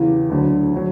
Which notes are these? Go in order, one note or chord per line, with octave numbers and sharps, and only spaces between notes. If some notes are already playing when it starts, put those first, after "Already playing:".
Already playing: E2 C#3 E3 G4
D2 D3 F#3
D3 F#3